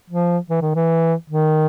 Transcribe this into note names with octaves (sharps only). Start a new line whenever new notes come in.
F3
E3
D#3
E3
D#3